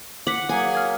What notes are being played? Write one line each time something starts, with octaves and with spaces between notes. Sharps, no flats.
F#5 D6 B6
F#3 A#3 G#4 G#5
F6 G#6